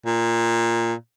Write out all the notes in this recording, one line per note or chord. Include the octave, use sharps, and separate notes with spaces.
A#2